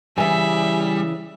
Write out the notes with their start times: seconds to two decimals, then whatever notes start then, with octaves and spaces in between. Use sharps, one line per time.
0.18 C#3 E3 G3 E5 G#5